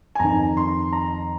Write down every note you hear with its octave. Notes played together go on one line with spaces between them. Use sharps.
G#5
F2 D#3 A#5
C6
A#5